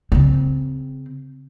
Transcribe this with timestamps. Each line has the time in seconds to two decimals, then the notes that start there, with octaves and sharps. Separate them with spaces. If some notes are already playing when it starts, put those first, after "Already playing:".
0.12 C#3 C4